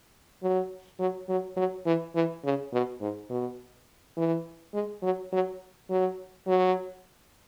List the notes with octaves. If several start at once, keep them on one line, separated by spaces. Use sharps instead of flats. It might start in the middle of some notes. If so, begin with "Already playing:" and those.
F#3
F#3
F#3
F#3
E3
E3
C#3
B2
G#2
B2
E3
G#3
F#3
F#3
F#3
F#3